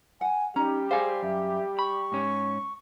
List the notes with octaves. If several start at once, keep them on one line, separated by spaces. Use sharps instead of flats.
F#5 G#5
G3 C#4 D#4 G4 A#5
G#4 C5 D5 F5 G#5
F#2 E5
B5 C#6
G#2 C#4